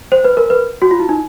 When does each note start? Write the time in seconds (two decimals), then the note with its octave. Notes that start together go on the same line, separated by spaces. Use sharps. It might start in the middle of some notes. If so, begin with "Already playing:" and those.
0.12 C5
0.24 B4
0.37 A#4
0.50 B4
0.82 F#4
0.91 F4
0.99 E4
1.09 D#4